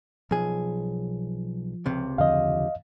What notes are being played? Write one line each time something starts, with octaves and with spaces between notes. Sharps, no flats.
B1 F3 G#4
C#2 C3
E2 D3 F3 D#5 F5